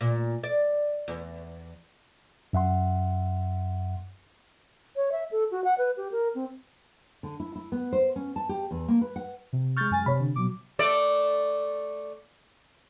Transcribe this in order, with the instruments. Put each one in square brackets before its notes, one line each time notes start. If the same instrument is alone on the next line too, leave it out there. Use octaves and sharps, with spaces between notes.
[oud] A#2
D5
E2
[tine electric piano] F#2 E5 F#5 C6
[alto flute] C#5
E5
A4
F#4
F#5
B4
G4
A#4
C4
[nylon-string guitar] D3
E4
E4
B3
C5
C#4
A5
G4
E2
A#3
B4
F#5
[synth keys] C3
[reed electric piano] G#3 F6 [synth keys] C#6 G6 A6
[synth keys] F#2 G#5 A6
[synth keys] C3 [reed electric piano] C#5 B5
[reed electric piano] D3
[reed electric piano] B2 F#3 [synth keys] D6
[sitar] A3 D5